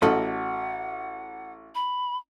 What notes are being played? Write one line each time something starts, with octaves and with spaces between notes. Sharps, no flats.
A1 F#4 A4 D#5 F#5
B5